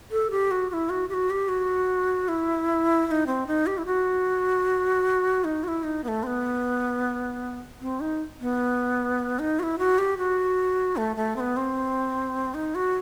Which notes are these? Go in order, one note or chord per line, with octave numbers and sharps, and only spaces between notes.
A4
G4
F#4
F#4
E4
F#4
G4
F#4
G4
F#4
E4
E4
D#4
C4
D#4
G4
E4
F#4
D#4
F#4
E4
D#4
B3
A3
C4
B3
C4
D#4
B3
D#4
F#4
E4
F#4
G4
F#4
A3
A3
C4
B3
C4
D#4
F#4